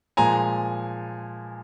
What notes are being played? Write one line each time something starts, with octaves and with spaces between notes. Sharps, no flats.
A#2 F3 G#3 G#5 A#5